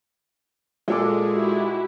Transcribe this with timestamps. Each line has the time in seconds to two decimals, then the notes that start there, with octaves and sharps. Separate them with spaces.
0.88 A#2 G#3 A4 D6
1.33 E4 F#4 G4